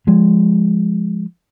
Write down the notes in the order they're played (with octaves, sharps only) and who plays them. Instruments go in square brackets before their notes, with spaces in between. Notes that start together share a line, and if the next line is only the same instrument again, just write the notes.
[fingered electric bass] F3 G#3